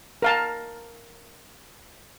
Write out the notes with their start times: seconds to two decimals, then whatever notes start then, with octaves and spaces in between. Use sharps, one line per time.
0.22 A#4 F5 A5